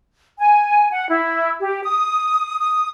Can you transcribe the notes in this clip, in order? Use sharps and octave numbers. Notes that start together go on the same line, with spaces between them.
G#5
F#5
E4
G4
D#6
D#6